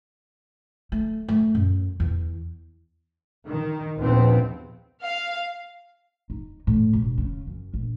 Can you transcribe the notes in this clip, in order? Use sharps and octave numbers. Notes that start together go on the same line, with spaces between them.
A3
A3
F#2
E2
D#3
A#1 D#2 B3 C4
F5
D#4
A2
E1
C#3
F#2
A#1